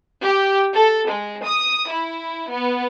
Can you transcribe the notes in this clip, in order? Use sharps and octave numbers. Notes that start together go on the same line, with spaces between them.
G4
A4
G#3
D#6
E4
B3